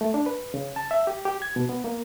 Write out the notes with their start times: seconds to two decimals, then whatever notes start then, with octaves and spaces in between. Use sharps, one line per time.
0.01 A3
0.14 D4
0.26 B4
0.54 C#3
0.76 A5
0.91 E5
1.07 G4
1.25 G4
1.42 G#6
1.56 B2
1.69 B3
1.84 A#3